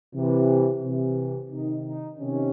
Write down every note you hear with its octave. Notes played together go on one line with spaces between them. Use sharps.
C3 E3
C3 E3
C3 D#3 D#4
D#4
C3 D#3 C#4